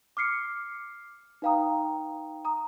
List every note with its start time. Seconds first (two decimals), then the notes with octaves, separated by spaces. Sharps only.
0.17 D6 F6 C7 C#7
1.42 D#4 B4 F5 G5 A#5 D#6
2.45 A#5 D#6